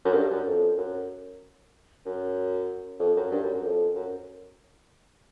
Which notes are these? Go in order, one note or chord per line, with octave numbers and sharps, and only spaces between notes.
F#2
G2
F#2
F2
F#2
F#2
F2
F#2
G2
F#2
F#2
F2
F#2